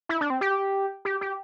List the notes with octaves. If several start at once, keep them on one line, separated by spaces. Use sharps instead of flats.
E4
D4
C4
G4
G4
G4